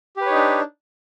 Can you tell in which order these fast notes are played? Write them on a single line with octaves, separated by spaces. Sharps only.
G4 B4 C#5 D#4 D4